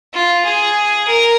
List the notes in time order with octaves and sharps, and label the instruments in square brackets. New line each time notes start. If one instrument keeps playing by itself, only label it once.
[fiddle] F4
G#4
A#4